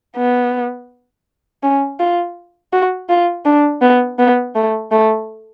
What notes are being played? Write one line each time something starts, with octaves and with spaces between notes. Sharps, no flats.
B3
C#4
F4
F#4
F4
D4
B3
B3
A3
A3